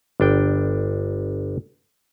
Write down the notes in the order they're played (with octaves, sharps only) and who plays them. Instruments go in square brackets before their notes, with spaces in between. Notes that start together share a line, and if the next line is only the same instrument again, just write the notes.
[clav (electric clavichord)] G1 D4 G5